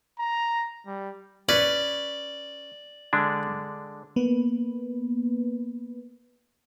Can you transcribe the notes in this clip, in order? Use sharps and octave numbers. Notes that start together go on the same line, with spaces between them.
A#5
G3
C#4 B4 D5
D3 G#3 D4
A#3 B3 B4